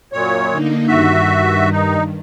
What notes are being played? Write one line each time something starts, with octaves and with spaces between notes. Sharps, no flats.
F#2 A#2 C#5
D3 A#3 D#4
G2 D#3 F#4 E5
D#4